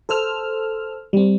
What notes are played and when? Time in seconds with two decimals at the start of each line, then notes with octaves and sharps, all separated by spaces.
0.09 A4 C5 E6 F6
1.13 G3 C4